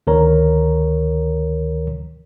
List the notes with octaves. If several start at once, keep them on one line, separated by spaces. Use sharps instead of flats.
D2 D#3 A#4 C#5 A#5